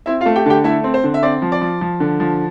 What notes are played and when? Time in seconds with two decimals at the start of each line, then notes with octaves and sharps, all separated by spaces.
0.06 C4 E4 E5
0.21 F4 F5
0.26 A3
0.36 G4 G5
0.46 D3 G4 G5
0.64 A3 E4 E5
0.84 C4
0.94 C5
1.04 D3
1.14 E5
1.23 C4 D5
1.42 F3
1.52 D5
1.61 F3
1.81 F3
2.00 D3
2.20 F3